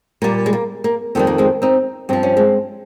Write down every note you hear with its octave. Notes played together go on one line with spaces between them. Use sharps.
A#2 G3 A#3
G#3
A#3
A#3
F2 D#3 G3 C4
A#3
G#3 C4
C4 D#4
G2 F3 C4
C#4
G#3 C4